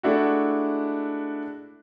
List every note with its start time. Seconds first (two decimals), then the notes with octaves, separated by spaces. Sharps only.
0.03 G#3 A3 D4 E4 F#4